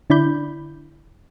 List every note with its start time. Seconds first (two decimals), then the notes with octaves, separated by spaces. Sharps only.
0.10 D3 D4 E4 D5 B5 G6